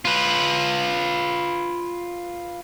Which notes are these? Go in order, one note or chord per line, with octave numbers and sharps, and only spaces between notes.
F4 B4